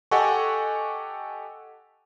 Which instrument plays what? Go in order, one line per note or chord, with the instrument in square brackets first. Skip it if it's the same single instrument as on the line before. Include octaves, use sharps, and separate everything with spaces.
[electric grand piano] G4 A4 D#5 F#5 G#5 C#6